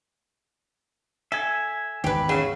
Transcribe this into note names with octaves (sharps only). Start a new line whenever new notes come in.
A4 E5 G#5
G#1 E2 D#3 G4 B4
C#3 F#3